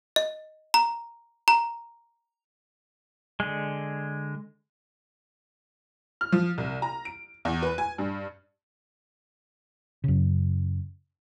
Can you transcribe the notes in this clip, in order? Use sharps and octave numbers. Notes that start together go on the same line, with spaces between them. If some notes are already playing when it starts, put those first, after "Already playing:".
D#5
A#5
A#5
D3 G#3
F6
F3
C2
A#5
D7
E2
B4
G#5
G2
F#2 C#3